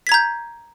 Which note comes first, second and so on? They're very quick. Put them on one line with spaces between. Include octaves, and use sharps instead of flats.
B6 G#6 A#5 G6